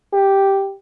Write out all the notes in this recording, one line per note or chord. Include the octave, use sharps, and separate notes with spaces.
G4